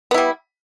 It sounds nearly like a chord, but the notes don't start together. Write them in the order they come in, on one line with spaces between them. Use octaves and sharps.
B3 E4 G3